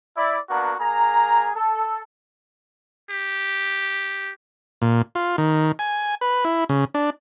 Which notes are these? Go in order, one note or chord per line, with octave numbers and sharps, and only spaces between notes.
E4 D5
A#3 B3 D4 F#4 A#5
A#3 G#4 A#5
A4
G4
A#2
F4
D#3
G#5
B4
E4
C#3
D4